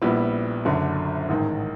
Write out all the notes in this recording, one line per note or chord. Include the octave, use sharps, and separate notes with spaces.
A#1 A#2 G3 B3 E4
F#1 F#2 D3
A1 G#2 D#3